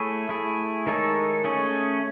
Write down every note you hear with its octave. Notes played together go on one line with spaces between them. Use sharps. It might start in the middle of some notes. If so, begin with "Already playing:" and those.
Already playing: A3 E4 G#4 C#5
A3 E4 G#4
D#3 G#3 D#4 A4 C#5
A3 C#4 G#4 C#5